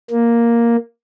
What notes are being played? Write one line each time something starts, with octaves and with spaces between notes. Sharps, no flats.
A#3